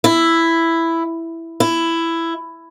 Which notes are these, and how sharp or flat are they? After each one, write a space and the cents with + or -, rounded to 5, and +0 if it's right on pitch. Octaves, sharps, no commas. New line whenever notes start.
E4 +5
E4 +10